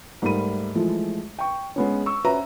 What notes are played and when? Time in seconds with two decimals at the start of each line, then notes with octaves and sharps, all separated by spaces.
0.22 G#2 G3 A3 A#4 B5 D#7
0.75 E3 F3 G#3 A3
1.39 G5 C#6
1.76 G#3 B3 C#4
2.06 C#6 E6
2.24 C#4 F#4 B4 C5 E5 A#5